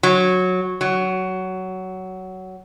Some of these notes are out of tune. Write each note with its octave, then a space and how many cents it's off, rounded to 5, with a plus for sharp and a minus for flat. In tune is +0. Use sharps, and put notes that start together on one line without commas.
F#3 -10
F#3 +15